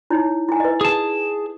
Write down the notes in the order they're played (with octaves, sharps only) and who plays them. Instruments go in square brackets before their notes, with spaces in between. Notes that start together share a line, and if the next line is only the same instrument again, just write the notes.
[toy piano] D#4 E4 C#5
E4 G#5
B4 D#5
[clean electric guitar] G#4 A5